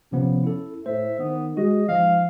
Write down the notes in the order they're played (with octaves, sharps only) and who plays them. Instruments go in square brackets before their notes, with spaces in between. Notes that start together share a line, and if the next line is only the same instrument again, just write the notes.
[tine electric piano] C3 F3 B3 [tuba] C#4
[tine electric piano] E4 A4
[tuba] A2 [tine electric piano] C5 [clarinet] E5
[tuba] D#3 [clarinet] B3
[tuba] G#3 [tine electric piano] F#4 [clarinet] D#5
[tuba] G#2 [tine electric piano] F3 [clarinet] F5